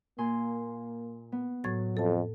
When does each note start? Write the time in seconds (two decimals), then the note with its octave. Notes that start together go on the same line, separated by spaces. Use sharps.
0.18 A#2 A#3 G#5 C6
1.32 B3
1.64 A2 F#3 G#6 A6
1.97 F2 A4 A5